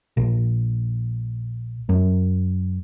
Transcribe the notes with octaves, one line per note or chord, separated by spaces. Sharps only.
A#1
F#2